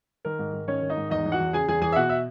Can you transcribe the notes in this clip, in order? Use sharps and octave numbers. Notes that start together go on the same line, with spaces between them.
D#3 A#4
G#2
G#2
D#3 C#4 C#5
D#3
D#4 D#5
G#2
E2 D#4 D#5
E3
F#4 F#5
E2
C#3 G#4 G#5
E2 G#4 G#5
E3 G#4 G#5
E5
B2 F#4 F#5
E5